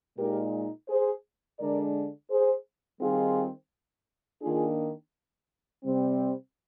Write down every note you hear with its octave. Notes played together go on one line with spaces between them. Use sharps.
A#2 G#3 D#4 G4 A#4
G#4 C5
D3 G#3 D4 A#4 D5
G#4 C5
D#3 G3 C4 D#4 F4 G#4
D#3 A#3 D4 F4 G#4
C3 G3 C4